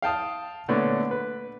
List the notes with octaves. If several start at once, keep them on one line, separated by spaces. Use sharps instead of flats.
F5 G5 A5 D#6
A#2 D3 A3 B3 C#5
B4